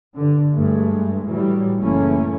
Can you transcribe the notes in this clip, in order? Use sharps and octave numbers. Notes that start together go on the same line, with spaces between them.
G2 D3
G2 G#3 A3
A2 E3 F#3 G3
F#1 C#3 E3 A3 A#3 C#4